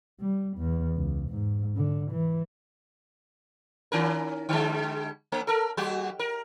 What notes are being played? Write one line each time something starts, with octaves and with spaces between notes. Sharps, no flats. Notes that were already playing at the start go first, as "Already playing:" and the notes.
G3
E2
C#2
G#2
D3
E3
D#3 C#4 A#4
D3 G3 G#3
A3
A4 A#4
F#3 F#4 G4
A#4